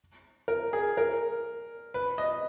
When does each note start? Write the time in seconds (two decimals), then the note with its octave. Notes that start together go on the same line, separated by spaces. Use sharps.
0.48 A#4
0.73 G#4
0.97 A#4
1.94 B4
2.18 D#5